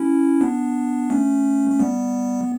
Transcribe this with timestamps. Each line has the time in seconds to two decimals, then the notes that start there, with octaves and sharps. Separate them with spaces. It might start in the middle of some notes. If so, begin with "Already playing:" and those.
Already playing: C#4 E4
0.41 B3 D4
1.10 A3 C#4
1.70 A3
1.80 G3 B3